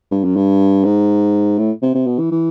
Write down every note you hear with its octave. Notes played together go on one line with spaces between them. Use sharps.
G2
F#2
G2
G#2
A2
C3
C3
B2
E3
E3